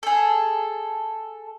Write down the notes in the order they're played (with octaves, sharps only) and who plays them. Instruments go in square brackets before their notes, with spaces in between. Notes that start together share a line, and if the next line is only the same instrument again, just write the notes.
[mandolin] G#4 A4